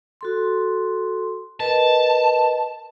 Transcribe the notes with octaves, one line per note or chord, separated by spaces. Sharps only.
F#4 A4 C6
A#4 B4 D#5 A5